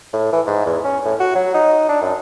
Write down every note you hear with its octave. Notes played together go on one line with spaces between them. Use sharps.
A2
E3
G#2
E2
C#4
A2
F#4
F#3
D#4
D4
F#2